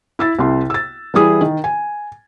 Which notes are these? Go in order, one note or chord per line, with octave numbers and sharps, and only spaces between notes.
E4 E6 A6
C2 C3 C6
E6 A6
E3 G3 E4 G#4 D#6
D#3
G#5